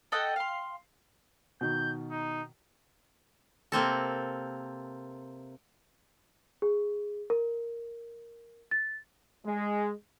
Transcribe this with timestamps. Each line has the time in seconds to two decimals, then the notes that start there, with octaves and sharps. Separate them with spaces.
0.12 A4 D#5 F#5 G5
0.36 F5 C6
1.61 B2 D#3 G6
2.11 D#4
3.72 C3 A#3 C4 A4
6.62 G#4
7.30 A#4
8.71 A6
9.46 G#3